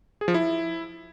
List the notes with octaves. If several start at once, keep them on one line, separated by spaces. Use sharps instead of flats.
G#4
F3
E4